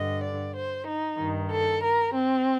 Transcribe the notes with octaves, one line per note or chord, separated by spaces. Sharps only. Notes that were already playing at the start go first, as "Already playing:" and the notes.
Already playing: G2 D3 D#5
D5
C5
D#4
G2 D#3
A4
A#4
C4